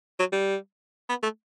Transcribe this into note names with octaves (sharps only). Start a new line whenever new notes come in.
F#3
G3
B3
A3